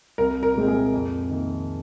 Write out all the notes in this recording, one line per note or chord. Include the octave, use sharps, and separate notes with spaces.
C2 A#4
A#4
A#2 G#3 C4
G#4
F2
D#3 A#3